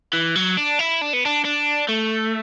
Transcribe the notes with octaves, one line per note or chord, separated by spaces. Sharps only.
E3
F#3
D4
E4
D4
B3
D4
D4
A3